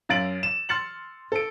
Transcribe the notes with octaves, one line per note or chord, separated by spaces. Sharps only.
F#2 F5 A6 D7 F#7
E7
C6 F6 A6 C#7 F#7
A4 D7